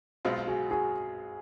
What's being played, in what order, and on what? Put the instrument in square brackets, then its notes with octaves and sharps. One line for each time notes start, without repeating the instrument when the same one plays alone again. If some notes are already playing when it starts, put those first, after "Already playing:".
[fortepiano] B1 B2 G#3 C4 F4
[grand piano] F#4 G#4
F#4 G#4